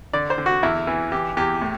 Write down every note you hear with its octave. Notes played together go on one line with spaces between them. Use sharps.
D3 D5
C5
D3
F#4
E2 E4
E3
E3 G4
E2 G4
A2